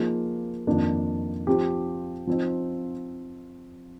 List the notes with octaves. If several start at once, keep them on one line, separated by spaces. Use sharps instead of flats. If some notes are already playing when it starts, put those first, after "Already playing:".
Already playing: F3 A#3 D#4 G#4
F2 D#3 A#3 D4
F3 C4 G4
F3 C4 D#4